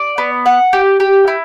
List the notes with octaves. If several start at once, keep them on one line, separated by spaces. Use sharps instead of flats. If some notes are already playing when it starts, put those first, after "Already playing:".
Already playing: D5
B3
F#5
G4
G4
E4